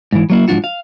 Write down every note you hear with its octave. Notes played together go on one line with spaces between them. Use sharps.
G#2 E3
F#3 A#3 E4
G#2 F3 G#3 D4 F4 F#4
F5